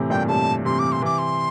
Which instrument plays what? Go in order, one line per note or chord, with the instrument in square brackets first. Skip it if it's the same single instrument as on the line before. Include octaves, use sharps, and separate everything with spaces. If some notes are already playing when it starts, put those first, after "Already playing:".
Already playing: [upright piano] A2 C3 E3
[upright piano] G2 A#2 [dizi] G5
[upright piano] A2 C3 [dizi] A5
[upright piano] C3 E3 [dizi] C6
[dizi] D6
C6
[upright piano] C3 E3 [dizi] D6
[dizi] C6